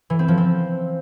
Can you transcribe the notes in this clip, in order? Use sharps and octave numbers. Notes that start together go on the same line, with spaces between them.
E3
C4
F3
C4